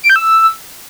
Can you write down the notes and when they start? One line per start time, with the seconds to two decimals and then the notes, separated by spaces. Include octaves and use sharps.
0.03 D7
0.10 G6
0.16 E6